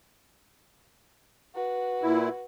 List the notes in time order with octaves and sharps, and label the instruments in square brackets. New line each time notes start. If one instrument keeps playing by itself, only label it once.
[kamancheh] F#4 B4
[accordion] A#2 E4